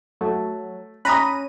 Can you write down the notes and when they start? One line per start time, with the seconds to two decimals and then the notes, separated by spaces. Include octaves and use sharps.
0.21 F#3 A3
1.05 C#4 A#5 B5 D#6 F#6 D#7